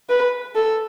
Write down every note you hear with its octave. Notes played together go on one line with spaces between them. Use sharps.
B4
A4